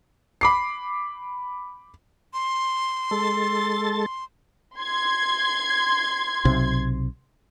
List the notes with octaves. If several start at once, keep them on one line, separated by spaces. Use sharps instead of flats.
B5 D6 C7
C6
G#3 A4 A6
C6 G#6
B1 C3